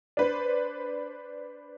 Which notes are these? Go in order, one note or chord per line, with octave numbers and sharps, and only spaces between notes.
D4 B4 C5